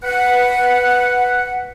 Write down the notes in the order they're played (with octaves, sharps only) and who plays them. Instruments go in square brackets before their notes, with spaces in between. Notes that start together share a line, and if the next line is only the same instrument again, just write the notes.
[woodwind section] B4 F#5